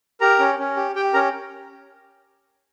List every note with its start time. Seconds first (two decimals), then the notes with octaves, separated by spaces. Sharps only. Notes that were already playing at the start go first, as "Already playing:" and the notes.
0.21 G4 A#4 A#5
0.39 C#4
0.58 C#4
0.77 G4
0.96 G4 G5
1.14 C#4 A#4 A#5